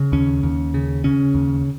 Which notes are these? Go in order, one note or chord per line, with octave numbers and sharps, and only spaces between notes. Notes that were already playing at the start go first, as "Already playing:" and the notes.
Already playing: C#3
D#2 C#4
D#2
C#3
C#3 C#4
D#2